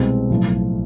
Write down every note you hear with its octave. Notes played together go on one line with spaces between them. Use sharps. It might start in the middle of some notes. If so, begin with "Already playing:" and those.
Already playing: C2 B2 G#3 C4
B1 A2 F3